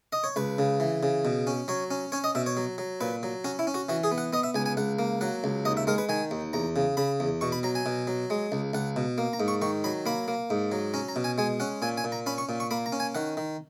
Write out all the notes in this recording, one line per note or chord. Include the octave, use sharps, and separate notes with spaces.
D#5
C#5
C#2 B4
C#3
E3
C#3
B2
C#4
F#3 C#5
C#4
C#4 C#5
D#5
B2 E5
C#5
F#3
F#3
A#2 B4
F#3
C#4 F#4
E4
C#4
F#4
E3 F#4
G#4
B3
F#5
B3 D#5
E5
C#2 G#5
G#5
C#2 F#5
A#3
F#3 F#5
C#2
D#2 D#5
E5
G#3 A#4
B4
D#3 G#5
D#2
E2 A#5
C#3
C#3 B5
E2
B2 C#6
B5
F#3 A#5
G#5
B2
F#3
G#3
C#2
C#2 F#5
B2
A#3
A#5
G#2
C#6
D#3 C#6
F#3 B5
A#3 B5
A#3
G#2
F#3
C#4 A#5
A#5
B2
G#5
G#3 G#5
C#4 F#5
A#2 G#5
G#5
A#2
A#5
C#4 B5
C#6
A#2
C#6
A#3 B5
A#5
C#4
G#5
D#3 F#5
D#3